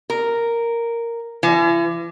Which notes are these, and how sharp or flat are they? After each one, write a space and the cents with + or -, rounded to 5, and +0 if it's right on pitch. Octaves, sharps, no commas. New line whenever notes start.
A#4 -5
E3 +40